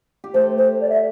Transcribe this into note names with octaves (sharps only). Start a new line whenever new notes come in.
G4
A3 A4 C5
C5
D5
E5